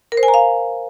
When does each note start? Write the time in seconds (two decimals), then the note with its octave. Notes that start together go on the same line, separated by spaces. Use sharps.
0.12 A#4
0.17 C5
0.23 G#5
0.28 A#5
0.34 F5